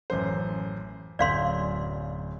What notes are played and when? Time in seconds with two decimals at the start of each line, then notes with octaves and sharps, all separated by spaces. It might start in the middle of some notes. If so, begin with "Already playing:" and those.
0.10 A1 F#2 C5
1.19 D1 F#2 D5 F5 C6 G6